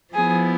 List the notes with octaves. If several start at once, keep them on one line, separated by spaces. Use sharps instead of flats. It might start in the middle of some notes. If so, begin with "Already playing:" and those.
F3 B3 E4 G#4